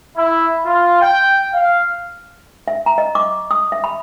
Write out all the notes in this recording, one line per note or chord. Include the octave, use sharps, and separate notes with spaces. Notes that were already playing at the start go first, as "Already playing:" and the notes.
E4
F4
G5
F5
E5
A#5
D#5
D6
D#6
E5
B5